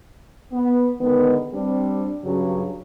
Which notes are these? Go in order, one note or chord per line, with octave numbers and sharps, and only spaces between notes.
B3
D3 D#3 G#3 B3
G3 C4 D4
G2 C#3 F#3